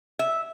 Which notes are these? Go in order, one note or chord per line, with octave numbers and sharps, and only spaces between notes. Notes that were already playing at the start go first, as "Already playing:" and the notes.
E5